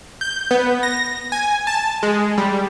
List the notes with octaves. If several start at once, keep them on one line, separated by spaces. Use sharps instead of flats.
G6
B3
A#6
G#5
A5
G#3
G3